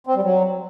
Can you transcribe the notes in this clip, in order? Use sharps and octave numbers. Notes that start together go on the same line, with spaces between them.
C4
G3
F#3